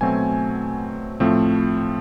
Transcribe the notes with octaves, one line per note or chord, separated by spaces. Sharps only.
B2 F#3 A3 C4 G#5
A2 F3 A3 C4